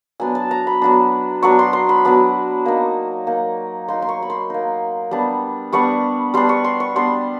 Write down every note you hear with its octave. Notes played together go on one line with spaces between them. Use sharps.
F#3 B3 D4 G#5
A5
A#5
B5
F#3 B3 D4
F#3 B3 D4 C#6
C6
C6
B5
F#3 B3 D4
A#3 D#4
A#3 D#4
A#3 D#4 C6
C6
C#6
B5
C6
A#3 D#4
G3 B3 D4
G3 B3 D4 C#6
G3 B3 D4 C6
C#6
C6
C#6
G3 B3 D4 C6